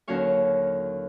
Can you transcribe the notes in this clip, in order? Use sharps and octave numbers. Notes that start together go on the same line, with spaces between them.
D#2 D3 F#3 C#4 F5 C#6